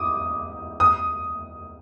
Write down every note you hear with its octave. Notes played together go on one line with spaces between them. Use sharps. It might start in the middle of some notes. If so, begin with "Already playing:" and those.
Already playing: D6 D#6
D#6